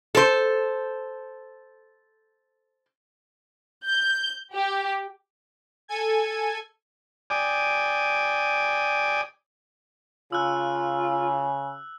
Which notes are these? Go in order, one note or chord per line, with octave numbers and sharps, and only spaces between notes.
A4 C5
G6
G4
A4 G#5 G#6
D5 G5 G#5 D6 D#6
C#3 F4 E6 F#6